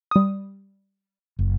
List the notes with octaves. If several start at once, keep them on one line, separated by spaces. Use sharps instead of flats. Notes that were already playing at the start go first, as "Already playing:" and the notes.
G3 D#6
F#1